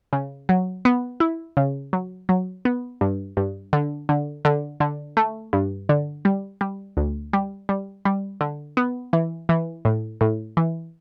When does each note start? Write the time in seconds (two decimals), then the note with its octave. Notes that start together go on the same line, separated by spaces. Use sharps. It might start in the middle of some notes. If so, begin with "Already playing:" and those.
0.13 C#3
0.49 F#3
0.85 B3
1.20 E4
1.57 C#3
1.93 F#3
2.29 F#3
2.65 B3
3.01 G2
3.37 G2
3.73 D3
4.09 D3
4.45 D3
4.80 D3
5.17 A3
5.53 G2
5.89 D3
6.25 G3
6.61 G3
6.97 D2
7.33 G3
7.69 G3
8.05 G3
8.41 D3
8.77 B3
9.13 E3
9.49 E3
9.85 A2
10.21 A2
10.57 E3